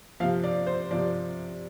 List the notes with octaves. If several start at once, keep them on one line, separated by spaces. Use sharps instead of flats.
C3 F3 F5
D5
C5
C3 F3 D5